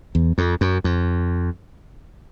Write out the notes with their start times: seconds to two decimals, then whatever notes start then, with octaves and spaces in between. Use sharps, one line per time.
0.15 E2
0.38 F2
0.61 F#2
0.84 F2